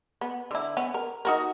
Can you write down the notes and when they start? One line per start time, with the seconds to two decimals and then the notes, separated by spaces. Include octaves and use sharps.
0.21 B3
0.51 D3 E4
0.77 B3 C#4
0.94 A#4
1.25 D#4 F#4 A#4